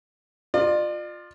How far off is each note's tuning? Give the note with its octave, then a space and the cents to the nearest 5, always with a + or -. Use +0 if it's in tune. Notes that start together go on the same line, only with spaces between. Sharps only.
F4 +10 D5 +40